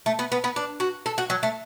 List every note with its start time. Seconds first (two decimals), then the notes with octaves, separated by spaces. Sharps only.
0.06 A3
0.19 B3
0.32 B3
0.44 B3
0.56 D4
0.80 F#4
1.06 A4
1.18 F#4
1.30 F#3
1.43 A3